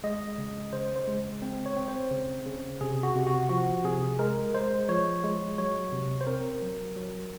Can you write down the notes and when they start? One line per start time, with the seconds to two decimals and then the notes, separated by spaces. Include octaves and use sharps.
0.04 G#3 D#5
0.38 C#3
0.73 C#3 C5
0.96 C5
1.08 G#3
1.42 C4
1.66 C#5
1.77 C4
1.88 C5
2.11 C#3
2.46 C#3
2.81 C3 G#4
3.03 F#4
3.16 C3
3.27 F#4
3.49 F3 F#4
3.84 C3 G#4
4.19 G#3 A#4
4.54 G#3 C5
4.89 F3 C#5
5.24 G#3
5.58 F#3 C#5
5.92 C3
6.21 C5
6.27 C4 A#4
6.63 F#3
6.96 F#3